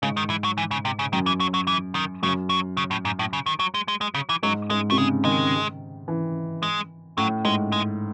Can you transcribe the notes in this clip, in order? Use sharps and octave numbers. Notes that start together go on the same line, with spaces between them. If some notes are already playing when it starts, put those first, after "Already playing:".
G#2 C#3
D#3
E3
F#3
E3
C#3
C3
C#3
F#2 D#3
E3
F#3
F#3
E3
D#3
F#2 C#3
F#3
C#3
A2
G#2
A2
C#3
D#3
F#3
G#3
G#3
G#3
C#3
E3
G#2 F#3
G#2 G#3
C3 A3
C#3 G#3
D#3 G#3
E3
G#3
A2 F#3
G#2 G#3
G#3